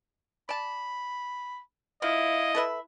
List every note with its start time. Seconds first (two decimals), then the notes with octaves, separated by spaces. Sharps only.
0.49 D5 A5 B5
2.02 F3 E4 D#5 F5
2.55 A4 B4 E5 B5